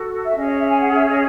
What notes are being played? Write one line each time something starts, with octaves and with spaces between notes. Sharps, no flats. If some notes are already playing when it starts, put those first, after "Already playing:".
Already playing: F#4 A4
E5
C#4 G#4 C#5 D#5
D#5
E5
G#5
F#5
E5
D#5